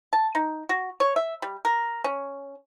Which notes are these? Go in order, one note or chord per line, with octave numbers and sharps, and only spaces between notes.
A5
D#4
F#4
C#5
E5
G3
A#4
C#4